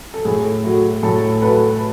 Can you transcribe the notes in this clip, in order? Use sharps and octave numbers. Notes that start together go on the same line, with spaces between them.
A4
A2 G#4
F#3 A3
A2 A4
F#3 A3 B4